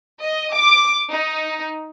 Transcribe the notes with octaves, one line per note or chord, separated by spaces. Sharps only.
D#5
D6
D#4